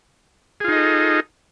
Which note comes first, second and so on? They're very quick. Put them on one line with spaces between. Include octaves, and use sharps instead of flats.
G#4 F4 D#4 D#5 A4